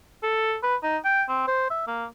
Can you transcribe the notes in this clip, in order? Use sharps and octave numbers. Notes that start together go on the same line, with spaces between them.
A4
B4
D#4
G5
C4
C5
E5
A#3